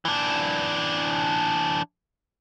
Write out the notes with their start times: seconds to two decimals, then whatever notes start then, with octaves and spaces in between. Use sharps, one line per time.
0.05 E3 D4